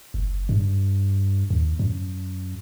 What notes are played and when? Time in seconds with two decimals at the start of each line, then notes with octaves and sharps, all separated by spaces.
0.14 F#1
0.49 G2
1.50 D#2
1.79 F#2